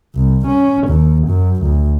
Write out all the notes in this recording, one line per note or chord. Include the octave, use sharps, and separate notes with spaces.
C2
C#4
D#2
F#2
D2